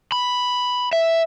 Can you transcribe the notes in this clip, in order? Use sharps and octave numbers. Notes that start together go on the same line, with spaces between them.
B5
E5